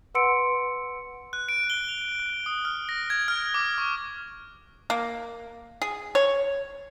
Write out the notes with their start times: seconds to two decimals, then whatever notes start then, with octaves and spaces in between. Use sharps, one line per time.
0.15 B4 F#5 C6 E6 C#7 D7
1.33 F#6
1.49 D7
1.70 G7
1.88 F7
2.20 F#6
2.46 D#6
2.65 F6
2.89 A#6
3.10 G#6
3.28 F6
3.54 D6
3.78 C#6
4.90 A#3
5.82 G#4
6.15 C#5